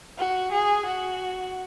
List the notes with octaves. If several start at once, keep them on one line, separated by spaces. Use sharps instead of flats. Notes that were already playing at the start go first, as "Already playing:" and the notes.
F#4
G#4
F#4